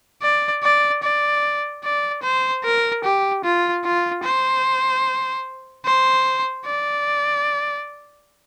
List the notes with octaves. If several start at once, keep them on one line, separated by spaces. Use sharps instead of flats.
D5
D5
D5
D5
C5
A#4
G4
F4
F4
C5
C5
D5